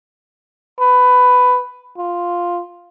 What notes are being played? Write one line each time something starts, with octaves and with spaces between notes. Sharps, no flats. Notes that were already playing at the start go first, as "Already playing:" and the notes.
B4
F4